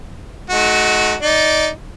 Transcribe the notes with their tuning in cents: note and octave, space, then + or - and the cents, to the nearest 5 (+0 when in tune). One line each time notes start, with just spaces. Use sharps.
A3 -40 D#4 +0 F#4 +0
D#4 +5 D5 -10